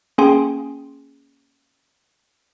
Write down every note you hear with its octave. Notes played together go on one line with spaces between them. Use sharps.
A#3 C#4 G#4 G5 G#5 C6